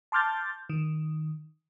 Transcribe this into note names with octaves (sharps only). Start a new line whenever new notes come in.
A5 C6 D6 F6 G6 A6
D#3